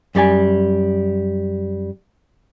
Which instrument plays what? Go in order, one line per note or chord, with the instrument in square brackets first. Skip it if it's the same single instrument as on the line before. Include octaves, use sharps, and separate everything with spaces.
[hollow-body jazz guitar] F#2 G3 D5 G#5